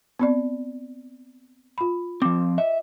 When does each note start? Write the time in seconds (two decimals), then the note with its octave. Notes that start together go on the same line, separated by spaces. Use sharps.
0.19 B3 C4 D5
1.78 F4 B5
2.22 F3 C4 D6
2.58 D#5 E5